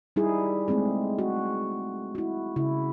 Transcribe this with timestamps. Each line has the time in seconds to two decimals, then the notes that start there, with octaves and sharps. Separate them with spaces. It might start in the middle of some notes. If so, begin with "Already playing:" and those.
0.16 G3 D#4 E4 G#4
0.68 G#3 A3 C4 G#4
1.19 F#4
2.15 E4 F#4
2.56 C#3 E4